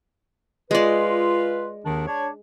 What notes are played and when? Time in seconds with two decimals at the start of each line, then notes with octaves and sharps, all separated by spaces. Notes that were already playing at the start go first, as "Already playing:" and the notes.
0.71 G#3 F4 B4 D5
1.85 D#2 D#3 D4
2.07 D4 C#5